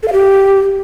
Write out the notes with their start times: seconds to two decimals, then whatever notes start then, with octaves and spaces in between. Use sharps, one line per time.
0.03 A4
0.08 F5
0.13 G4